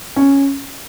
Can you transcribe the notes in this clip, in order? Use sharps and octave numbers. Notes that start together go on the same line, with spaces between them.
C#4